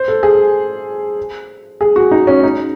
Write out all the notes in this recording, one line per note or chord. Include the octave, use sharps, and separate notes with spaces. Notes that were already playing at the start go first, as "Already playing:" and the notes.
Already playing: C5
A4
G#4
G#4
F#4
D#4
C#4
D#4